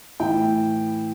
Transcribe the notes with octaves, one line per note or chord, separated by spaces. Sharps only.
A2 E3 G5